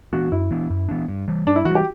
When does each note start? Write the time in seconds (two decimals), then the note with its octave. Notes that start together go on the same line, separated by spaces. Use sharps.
0.13 E3 B3 D4 F#4
0.32 F#2 E4
0.51 E3 B3 D4
0.70 F#2
0.89 E3 B3 D4
1.08 G2
1.28 E3 G3
1.46 G2 D4
1.56 E4
1.65 E3 F#4
1.70 G3
1.75 G4